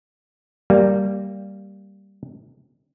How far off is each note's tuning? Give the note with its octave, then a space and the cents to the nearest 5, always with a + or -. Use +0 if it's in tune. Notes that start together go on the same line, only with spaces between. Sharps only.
G3 +0 A#3 -10